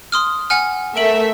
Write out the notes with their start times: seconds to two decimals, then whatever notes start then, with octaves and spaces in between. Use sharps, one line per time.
0.12 C6 D#6 F6
0.50 F#5 G#5 F6
0.97 A3 A#4 E5 D7 F#7